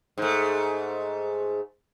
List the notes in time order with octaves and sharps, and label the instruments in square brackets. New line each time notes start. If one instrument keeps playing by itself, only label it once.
[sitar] G#2 A3